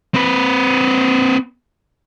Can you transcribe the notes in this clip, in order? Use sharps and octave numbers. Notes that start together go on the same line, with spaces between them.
C4 B4